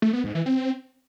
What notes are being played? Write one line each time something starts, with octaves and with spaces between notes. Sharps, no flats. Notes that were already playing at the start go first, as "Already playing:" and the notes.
A3
B3
G#2
E3
C4